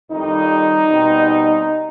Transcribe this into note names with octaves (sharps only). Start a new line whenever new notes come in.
F2 D#3 G3 D#4
B2 G3 C4